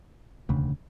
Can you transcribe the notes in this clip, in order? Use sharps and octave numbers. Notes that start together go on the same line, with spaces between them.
E1 D2 C#3